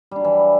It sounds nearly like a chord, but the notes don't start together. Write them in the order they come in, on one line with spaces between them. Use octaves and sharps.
G3 D4 F#3 E3